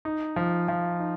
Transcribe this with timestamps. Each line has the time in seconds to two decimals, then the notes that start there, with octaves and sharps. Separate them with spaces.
0.05 D#4
0.36 F3
0.68 F3
1.00 D#4